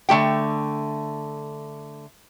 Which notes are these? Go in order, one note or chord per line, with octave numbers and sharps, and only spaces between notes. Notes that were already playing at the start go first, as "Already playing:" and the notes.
D3 A3 G4 G5